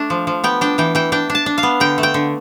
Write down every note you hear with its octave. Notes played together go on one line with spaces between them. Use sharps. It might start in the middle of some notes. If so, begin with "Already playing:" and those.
Already playing: A3 D4
F3
F3
B3 G5
D4 G5
E3 G5
E3 G5
D4 G5
D4
A5
D4
F5
B3
D3 G5
A3
G5
D3